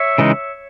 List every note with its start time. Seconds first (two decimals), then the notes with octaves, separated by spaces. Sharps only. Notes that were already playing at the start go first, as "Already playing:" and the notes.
Already playing: C#5 E5
0.18 C#3 E3 G#3 D#4